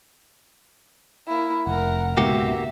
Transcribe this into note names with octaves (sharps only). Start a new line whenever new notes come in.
A#3 E4
F1 A#4 F#5
C#2 G#2 B2 A#3 F#4 G4 E5